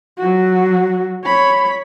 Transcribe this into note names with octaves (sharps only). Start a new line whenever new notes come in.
F#3 F#4
C#5 B5